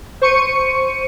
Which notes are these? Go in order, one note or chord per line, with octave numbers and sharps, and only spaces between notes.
C5 C#6 C#7 D#7